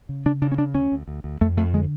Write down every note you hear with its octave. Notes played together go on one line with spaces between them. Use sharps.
C#3
C#3 D4
C#3 D4
C#4
C#3 D4
D2 C#4
D2
D2
D2
F2 A3
F2 A3
D3 G#3